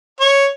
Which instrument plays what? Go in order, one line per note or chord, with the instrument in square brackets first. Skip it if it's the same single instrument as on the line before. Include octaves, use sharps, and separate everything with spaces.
[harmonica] C#5